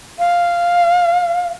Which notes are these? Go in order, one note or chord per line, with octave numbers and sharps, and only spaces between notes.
F5